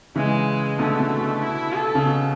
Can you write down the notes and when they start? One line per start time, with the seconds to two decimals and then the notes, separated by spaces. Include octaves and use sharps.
0.16 C#3 E3 G#3
0.79 B2 D3 A3
1.00 B2
1.21 B2
1.42 E4
1.74 A4
1.95 C#3
2.05 B2